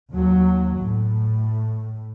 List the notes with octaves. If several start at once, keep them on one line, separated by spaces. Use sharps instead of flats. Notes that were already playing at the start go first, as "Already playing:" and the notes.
D#2 F#3
A2